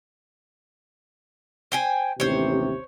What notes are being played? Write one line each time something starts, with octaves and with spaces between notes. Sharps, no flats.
C5 G5 G#5
A1 D#2 C3 C5 C#5